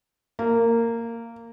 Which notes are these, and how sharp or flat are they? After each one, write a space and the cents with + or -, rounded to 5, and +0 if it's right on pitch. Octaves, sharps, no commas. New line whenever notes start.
A#3 -15